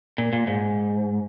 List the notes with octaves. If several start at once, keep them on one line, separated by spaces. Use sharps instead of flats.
A#2
A#2
G#2